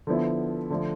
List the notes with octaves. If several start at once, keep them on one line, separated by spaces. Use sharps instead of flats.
D3 F3 B3 E4
D3 F3 A3